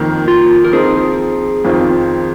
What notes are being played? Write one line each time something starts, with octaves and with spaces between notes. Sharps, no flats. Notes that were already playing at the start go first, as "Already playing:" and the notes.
Already playing: F2 D#3 A#3
F4
A#4
F3 C4 D#4 G#4
F2 D#3 C4 F4